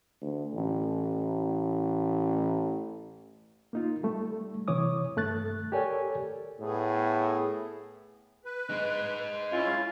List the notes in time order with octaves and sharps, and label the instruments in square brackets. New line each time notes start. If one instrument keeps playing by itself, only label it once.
[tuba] D2
A1
[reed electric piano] A#3 D#4 F4
G3 A3
C3 E3 C#5 D6 D#6
G2 A3 F#6 A6
G4 A4 A#4 C#5 D5 G#5
[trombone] A2 [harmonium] B3 G#4
[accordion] B4
[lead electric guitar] G#3 D#4
[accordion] C#4 E4 [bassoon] F4